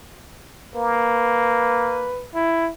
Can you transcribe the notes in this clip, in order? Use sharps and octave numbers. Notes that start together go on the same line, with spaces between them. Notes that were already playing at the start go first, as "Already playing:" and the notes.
A#3 B4
E4